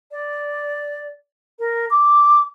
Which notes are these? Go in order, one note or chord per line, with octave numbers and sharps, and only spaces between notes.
D5
A#4
D6